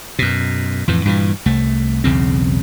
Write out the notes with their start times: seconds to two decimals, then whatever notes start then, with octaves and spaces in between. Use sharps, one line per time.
0.19 F#2 B2
0.88 F2 A2 E3
1.05 G2 A#2 D#3 E3
1.46 C2 A3
2.04 B1 E2 C#3 C4